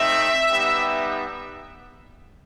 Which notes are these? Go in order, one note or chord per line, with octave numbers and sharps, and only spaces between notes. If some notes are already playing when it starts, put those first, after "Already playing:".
Already playing: A3 C4 D#4 E5
G3 B3 D#4 G4